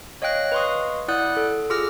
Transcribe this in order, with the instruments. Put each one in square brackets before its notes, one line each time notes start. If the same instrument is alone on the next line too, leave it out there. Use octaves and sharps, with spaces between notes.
[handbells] C#5 D#5 F5 G5 F#6 A#6
B4 D#5 F5 C6 C#6 D#6
E4 D5 F#5 D#6 F#6 G6
A4
F4 G#4 D6 E6 F6 A#6